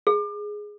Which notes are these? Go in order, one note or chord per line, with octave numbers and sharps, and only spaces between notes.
G#4